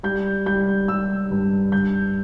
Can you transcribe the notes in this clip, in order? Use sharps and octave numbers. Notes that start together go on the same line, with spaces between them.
G3 G6
G3 G6
G3 E6
G2
G2 G6